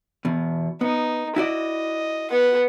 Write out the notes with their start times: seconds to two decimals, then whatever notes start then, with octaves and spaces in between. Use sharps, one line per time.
0.25 E2 B2
0.81 B3 D#4
1.36 E4 F#4 D5 D#5
2.31 B3 F#5